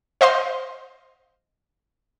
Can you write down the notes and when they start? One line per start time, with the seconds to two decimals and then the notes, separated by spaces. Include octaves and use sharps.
0.21 C5 D#5 F5 C6